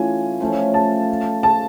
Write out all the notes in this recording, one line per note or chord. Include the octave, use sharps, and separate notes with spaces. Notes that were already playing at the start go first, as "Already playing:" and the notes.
Already playing: E3 A3 C#4 F4 G#5
F3 A3 C#4 F4
A5
A5